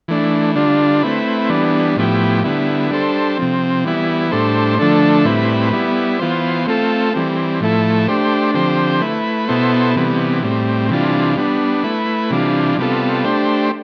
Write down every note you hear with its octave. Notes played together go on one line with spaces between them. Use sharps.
E3 A3 D4
D3 G3 D4 F4
A3 C4 E4 B4
E3 G3 B3 D4
A2 F3 B3 E4 G4
D3 G3 B3 E4
G3 D4 A4 C5
C3 F3 C4
E3 G3 B3 E4
A2 G3 D4 A4 C5
D3 F3 A3 D4 A4
A2 G3 C4 E4 B4
G3 B3 E4
E3 B3 F4 C5
A3 C4 F4 A4
E3 G3 C4
A2 F3 A3 E4 A4
A3 D4 G4 C5
D3 F3 C4 G4 C5
A3 E4 B4
B2 B3 E4 A4 C5
C3 E3 G3 B3
A2 G3 C4
C3 E3 G3 D4 F4
G3 B3 D4
A3 E4 B4
C3 E3 G3 D4 F4
C3 G3 B3 F4 A4
A3 D4 G4 C5